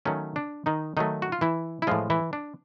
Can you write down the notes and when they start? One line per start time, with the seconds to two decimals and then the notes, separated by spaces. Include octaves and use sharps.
0.05 D#3 F#3 A3 C#4
0.36 D4
0.66 D#3 D#4
0.97 D#3 F#3 A3 D#4
1.22 F#4
1.32 F4
1.41 E3 E4
1.82 E4
1.87 A2 E3 F3 G#3 F4
2.10 E3 E4
2.33 D4